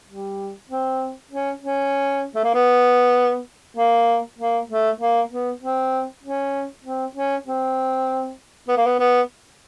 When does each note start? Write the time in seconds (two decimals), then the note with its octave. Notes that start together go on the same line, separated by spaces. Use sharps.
0.08 G3
0.70 C4
1.31 C#4
1.62 C#4
2.35 A3
2.44 A#3
2.54 B3
3.77 A#3
4.38 A#3
4.69 A3
5.00 A#3
5.31 B3
5.62 C4
6.23 C#4
6.84 C4
7.15 C#4
7.46 C4
8.68 B3
8.77 A#3
8.86 B3
9.00 B3